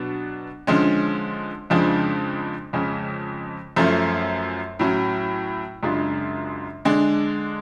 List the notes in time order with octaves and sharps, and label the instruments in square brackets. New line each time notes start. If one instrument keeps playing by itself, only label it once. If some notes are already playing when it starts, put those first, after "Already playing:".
Already playing: [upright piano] B2 F#3 B3 D4
D3 F3 G#3 C#4
F2 C#3 F3 G#3 D4
F2 C#3 G#3 C#4
F#2 F3 A3 C#4
A2 F#3 C#4
F#2 C#3 G#3 D4 F4
D3 G#3 D4